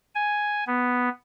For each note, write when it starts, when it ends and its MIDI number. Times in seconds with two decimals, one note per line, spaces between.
0.15 0.64 80
0.67 1.09 59